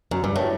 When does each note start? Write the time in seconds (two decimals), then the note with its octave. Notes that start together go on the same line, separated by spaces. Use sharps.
0.11 F#2
0.24 G2
0.36 A2